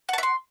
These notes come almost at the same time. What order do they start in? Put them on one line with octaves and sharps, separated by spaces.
F#5 A5 E5 C6